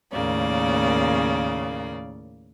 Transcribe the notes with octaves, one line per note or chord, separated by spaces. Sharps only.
D#2 A2 C#3 A#3 D5